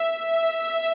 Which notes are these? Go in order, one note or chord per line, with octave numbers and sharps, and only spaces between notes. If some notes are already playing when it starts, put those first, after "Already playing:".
Already playing: E5